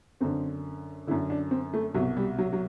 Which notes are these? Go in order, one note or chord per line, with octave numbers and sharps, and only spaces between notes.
F#2 D3 C4
F#2 D3 E4
D4
C4
A3
C2 B2 F#3
G3
F#3
F#3